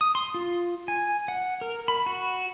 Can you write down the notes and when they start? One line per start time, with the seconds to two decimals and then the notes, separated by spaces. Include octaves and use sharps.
0.01 D#6
0.15 C6
0.34 F4
0.88 G#5
1.28 F#5
1.61 A#4
1.88 B5
2.06 F#4